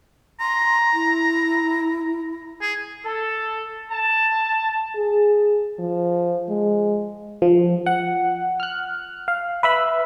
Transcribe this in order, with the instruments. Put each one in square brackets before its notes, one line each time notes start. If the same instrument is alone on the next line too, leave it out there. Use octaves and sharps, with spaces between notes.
[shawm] A#5 [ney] C6
[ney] E4
[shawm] G#4
[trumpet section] A4
A5
[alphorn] G#4
F3
G#3
[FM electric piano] F3
F#5
F6 F#6
F5
B4 E5 B5